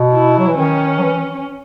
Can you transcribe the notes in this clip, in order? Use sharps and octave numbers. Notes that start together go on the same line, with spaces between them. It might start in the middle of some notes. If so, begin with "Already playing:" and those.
Already playing: B2
E4
F#3
E3
D#3 C#4
F#3
E3